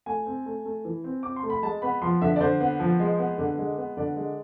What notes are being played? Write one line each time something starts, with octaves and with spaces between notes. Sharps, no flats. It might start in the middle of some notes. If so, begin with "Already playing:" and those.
A3 G#5
C4
A3
A3
E3
C4
C4 D6
C6
A3
B5
G#3 A5
B3 B5
F3 C6
D3 E5
D5
D3 C5
B3
F3
G#3
B3
D3
G#3
B3
D3 D5
G#3